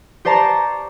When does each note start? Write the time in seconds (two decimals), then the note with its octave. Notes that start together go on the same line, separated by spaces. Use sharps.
0.25 G4 C5 D5 A5 A#5 C#6